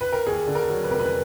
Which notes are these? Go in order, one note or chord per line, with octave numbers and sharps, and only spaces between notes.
B4
A#4
D#2 G#4
D3
A#4
F#3
B4
F1 A#4
B4